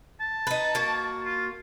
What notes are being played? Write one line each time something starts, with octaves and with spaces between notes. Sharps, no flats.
A5
D#4 B4
A#3 F#4
F4